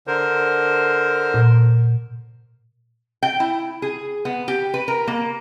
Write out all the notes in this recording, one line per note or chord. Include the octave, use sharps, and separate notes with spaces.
D3 A#4 C5
A#2
G5
E4
G#4
B3
G4
B4
A#4
A#3